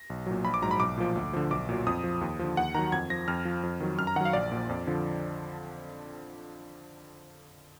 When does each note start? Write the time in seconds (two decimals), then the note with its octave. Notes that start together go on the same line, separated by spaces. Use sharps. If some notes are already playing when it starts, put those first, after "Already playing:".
Already playing: A#6
0.10 B1
0.27 A#2 F#3
0.44 A#1 B5
0.54 D6
0.62 G#2 F#3 A#5
0.71 B5
0.80 B1 D6
0.97 A#2 F3
1.16 D2
1.33 D3 F3
1.50 B1 D6
1.69 A#2 F#3
1.87 F2 D#6
2.04 F3
2.21 D#2
2.39 D3 F3
2.57 D#2 F#5
2.75 D#3 F#3 A#5
2.92 F2 G#6
3.10 F3 A#6
3.28 F2 F6
3.45 F3
3.63 F2
3.80 D#3 F#3
3.99 F#2 F6
4.07 A#5
4.16 D#3 F#5
4.21 F#3 F5
4.33 A#1 D5
4.52 A#2 F3
4.69 F2
4.87 D3 F3